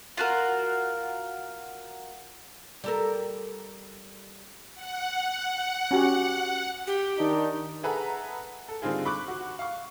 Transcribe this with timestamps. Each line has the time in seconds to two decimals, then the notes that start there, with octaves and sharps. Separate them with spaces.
0.17 F4 F#4 A#4
2.84 G3 A4 A#4
4.75 F#5
5.91 C#4 F#4 G4
6.87 G4
7.18 D#3 D4 D#4
7.83 G#4 A4 B4 E5 F#5 A#5
8.69 A4
8.82 D3 G3 C4 D#4 F4 G#4
9.05 B5 C#6 D6 F#6
9.28 F#4
9.59 F5 C#6